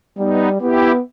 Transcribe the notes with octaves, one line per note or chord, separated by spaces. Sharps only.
G3 B3 D#4
B3 E4 G4